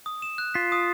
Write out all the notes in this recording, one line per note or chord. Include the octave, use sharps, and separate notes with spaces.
D#6
E7
F#6
F4 B6
D#6